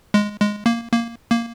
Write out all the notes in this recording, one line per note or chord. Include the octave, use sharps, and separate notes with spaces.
G#3
G#3
A#3
A#3
A#3